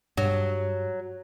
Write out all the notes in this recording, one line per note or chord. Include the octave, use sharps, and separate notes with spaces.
G2 F#3